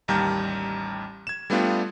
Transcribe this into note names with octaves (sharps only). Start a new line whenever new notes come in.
A1 D#2 G3 A#5 F6 G6
G#6 E7
G3 A3 B3 D4 F4 G4